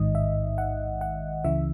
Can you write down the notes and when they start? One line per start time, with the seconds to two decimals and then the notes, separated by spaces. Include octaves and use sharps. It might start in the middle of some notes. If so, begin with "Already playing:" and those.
Already playing: A1 G#2 D#3 D#5
0.15 E5
0.58 F#5
1.01 F#5
1.44 C#2 C#3 E3 E5